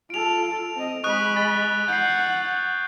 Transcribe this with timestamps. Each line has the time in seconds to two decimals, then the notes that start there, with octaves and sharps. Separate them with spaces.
0.10 F4 A4 D7 F7
0.75 C4 D#5
1.04 G#3 B5 C#6 D#6 F#6
1.36 A6 G7
1.88 F#5 G6 C7